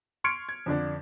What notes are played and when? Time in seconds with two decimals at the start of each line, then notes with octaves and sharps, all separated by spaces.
0.24 C6 C#6 F6 G#6 C#7 D7
0.49 G#6
0.66 F2 D3 D4